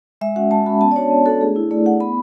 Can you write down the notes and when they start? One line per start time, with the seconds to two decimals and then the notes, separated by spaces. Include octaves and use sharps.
0.21 G#3 E5
0.36 C#4 F#4 F#5
0.51 G#3 A5
0.66 C#4 F#4 B5
0.81 B3 A5
0.91 D5
0.96 D4 F#4 C#5
1.11 B3
1.26 D4 F#4 A4
1.41 A3 G#4
1.56 E4
1.71 A3 D5
1.86 E4 F#5
2.00 B3 B5